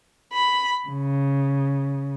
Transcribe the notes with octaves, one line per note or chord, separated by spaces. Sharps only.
B5
C#3